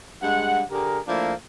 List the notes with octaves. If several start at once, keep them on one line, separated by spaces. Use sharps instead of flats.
G2 G#3 F#5
D3 G4 G#4 A#4
F3 A3 A#3 D4 E4